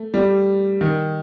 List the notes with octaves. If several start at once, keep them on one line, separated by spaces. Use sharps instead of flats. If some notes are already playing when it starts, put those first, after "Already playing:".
Already playing: A3
G3
D#3